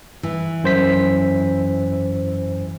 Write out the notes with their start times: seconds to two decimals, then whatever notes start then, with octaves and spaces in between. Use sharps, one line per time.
0.23 E3
0.64 F#2 C5 B6